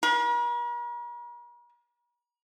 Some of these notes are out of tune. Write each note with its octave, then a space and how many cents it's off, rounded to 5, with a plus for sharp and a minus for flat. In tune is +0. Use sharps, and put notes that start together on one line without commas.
A#4 +45